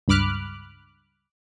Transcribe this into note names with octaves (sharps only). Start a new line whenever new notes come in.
C#2 G2 B5 D6 F6 F#6